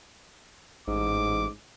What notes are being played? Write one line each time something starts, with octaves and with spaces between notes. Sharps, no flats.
A1 G#2 D6